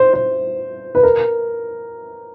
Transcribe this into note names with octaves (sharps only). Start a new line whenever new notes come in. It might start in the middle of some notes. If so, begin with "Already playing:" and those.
Already playing: C5
C5
B4
A#4